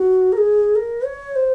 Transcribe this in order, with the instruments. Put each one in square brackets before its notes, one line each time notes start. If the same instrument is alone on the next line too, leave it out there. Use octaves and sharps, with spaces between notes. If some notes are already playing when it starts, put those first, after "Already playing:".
Already playing: [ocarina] F#4
A#4
G#4
A#4
C#5
C5